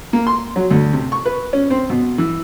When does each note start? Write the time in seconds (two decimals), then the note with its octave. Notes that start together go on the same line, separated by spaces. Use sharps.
0.13 A#3
0.27 C6
0.56 F#3
0.71 D2
0.93 C3
1.12 C#6
1.25 B4
1.53 C#4
1.70 C4
1.90 B2
2.18 E3